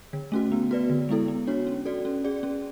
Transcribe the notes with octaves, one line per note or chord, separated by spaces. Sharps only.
D3
A3 C#4 F#4
B3
F#4 B4 D5
D3
G#3 B3 E4 A4
B3
D4 F#4 C#5
C#4
F#4 A4 D5
C#4
G#4 D5
C#4